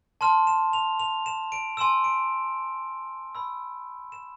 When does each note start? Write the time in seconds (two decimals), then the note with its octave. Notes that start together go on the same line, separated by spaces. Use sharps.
0.21 A5 C6 F6 E7
0.47 E7
0.73 F7
1.00 F7
1.26 E7
1.52 D7
1.77 G#5 C6 E6 E7
2.04 D7
3.35 B5 E6
4.12 E7